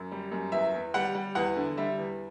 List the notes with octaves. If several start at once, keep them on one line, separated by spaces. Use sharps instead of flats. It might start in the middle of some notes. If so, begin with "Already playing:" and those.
Already playing: F#2
G3
F#2
E2 E5
E2
G3 F#5
G3
E2 F#5
D3
G3 E5
E2